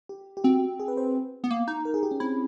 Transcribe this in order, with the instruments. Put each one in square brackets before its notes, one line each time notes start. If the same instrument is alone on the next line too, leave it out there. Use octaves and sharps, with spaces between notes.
[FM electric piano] G4
G4
[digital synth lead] C4 [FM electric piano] F#4
[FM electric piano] G#4
B4
C5
[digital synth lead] B3
A#3
D#4
[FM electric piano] A#4
G#4
G4
C#4
[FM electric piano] C4 [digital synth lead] E4